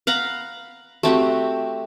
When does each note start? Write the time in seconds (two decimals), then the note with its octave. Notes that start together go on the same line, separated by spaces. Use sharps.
0.07 F5 F#5 A#5 B5
1.03 A3 C4 F#4 G4